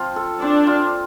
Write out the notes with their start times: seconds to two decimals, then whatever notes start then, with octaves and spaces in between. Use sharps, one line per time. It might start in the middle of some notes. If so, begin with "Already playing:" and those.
Already playing: F3 C4 F4
0.16 A4
0.42 C4 D4
0.67 F4